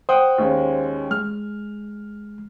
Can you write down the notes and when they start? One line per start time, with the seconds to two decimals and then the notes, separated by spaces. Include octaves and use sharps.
0.09 C5 F#5 G5 D#6
0.38 D#2 G#3 C#4
1.11 G#3 F6